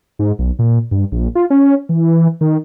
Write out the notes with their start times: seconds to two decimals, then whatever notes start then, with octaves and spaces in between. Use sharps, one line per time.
0.19 G#2
0.39 B1
0.59 A#2
0.91 G2
1.12 A#1
1.35 F4
1.50 C#4
1.89 E3
2.41 D#3